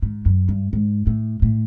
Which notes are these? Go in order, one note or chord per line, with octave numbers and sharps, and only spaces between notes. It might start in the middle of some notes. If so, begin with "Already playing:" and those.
G#2
F#2
G2
G#2
A2
A2